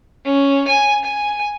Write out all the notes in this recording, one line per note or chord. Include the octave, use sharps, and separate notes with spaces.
C#4
G#5
G#5